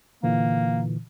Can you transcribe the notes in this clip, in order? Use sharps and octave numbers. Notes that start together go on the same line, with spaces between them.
A#2 D3 E3 A#3